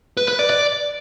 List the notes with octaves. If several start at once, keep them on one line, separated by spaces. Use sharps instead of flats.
B4
B4
D5
D5